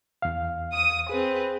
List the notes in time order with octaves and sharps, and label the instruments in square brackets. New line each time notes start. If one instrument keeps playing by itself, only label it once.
[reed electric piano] E2 F5
[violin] D#6 D#7
[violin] C4 B4 [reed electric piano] G#4